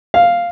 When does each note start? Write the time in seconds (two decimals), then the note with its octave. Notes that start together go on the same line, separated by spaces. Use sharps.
0.14 F5